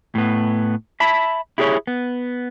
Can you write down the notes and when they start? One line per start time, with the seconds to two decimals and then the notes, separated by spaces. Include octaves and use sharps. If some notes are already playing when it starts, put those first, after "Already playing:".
0.15 A2 B3
1.00 E5 A5 B5
1.58 E4 G4 G#4 B4 C#5
1.87 B3